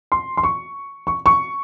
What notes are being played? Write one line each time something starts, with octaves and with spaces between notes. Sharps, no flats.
C6
C6
C#6
C#6
C#6